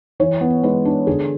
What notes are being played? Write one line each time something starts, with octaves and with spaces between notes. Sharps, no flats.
E3 C#5
B3
G#3 B4
D4
D3 G#4